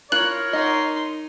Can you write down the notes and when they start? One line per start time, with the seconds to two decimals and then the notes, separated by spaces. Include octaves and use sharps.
0.12 E4 F4 A#4 C#5 F#6 F#7
0.53 D#4 D#5 F#5 C6